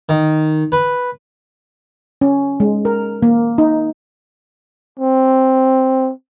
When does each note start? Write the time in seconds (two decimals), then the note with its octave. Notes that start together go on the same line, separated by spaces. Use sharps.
0.09 D#3
0.72 B4
2.21 C#4
2.60 G#3
2.85 A#4
3.22 A#3
3.58 D#4
4.99 C4